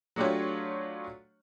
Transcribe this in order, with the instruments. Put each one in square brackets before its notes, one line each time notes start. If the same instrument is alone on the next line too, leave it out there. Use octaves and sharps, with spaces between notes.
[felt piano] F#3 A3 D4 F4 G4 C#5